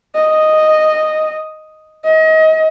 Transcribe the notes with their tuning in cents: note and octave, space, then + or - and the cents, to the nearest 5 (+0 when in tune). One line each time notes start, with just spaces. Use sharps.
D#5 -5
D#5 +30